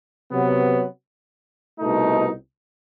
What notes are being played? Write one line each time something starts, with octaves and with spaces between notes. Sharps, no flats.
C3 F#3 B3
C2 B2 A3 D#4